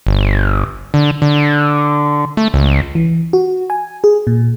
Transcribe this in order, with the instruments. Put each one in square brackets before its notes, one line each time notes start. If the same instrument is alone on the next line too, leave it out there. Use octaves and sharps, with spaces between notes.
[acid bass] G1
D3
D3
A3
C#2
[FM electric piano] E3
F#4
G#5
G#4
A#2